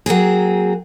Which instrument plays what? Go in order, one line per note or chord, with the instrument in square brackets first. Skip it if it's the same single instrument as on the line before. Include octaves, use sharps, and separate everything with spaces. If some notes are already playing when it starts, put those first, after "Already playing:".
[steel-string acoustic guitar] F#3 A#3 C4 G#4